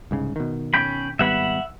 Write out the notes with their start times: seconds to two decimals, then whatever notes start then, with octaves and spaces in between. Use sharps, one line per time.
0.11 C2 G#2 C#3
0.36 B2 D#3
0.74 C#4 G5 B5
1.19 G#1 G3 B3 E5 F#5 B5